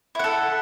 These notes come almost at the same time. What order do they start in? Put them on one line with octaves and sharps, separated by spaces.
E4 F#5 A4